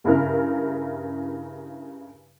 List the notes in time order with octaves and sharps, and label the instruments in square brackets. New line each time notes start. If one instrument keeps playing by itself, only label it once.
[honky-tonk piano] G2 C#3 E4 A#4 F6